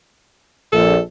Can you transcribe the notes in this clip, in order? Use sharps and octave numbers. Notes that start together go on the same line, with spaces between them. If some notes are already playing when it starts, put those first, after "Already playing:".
A#1 A4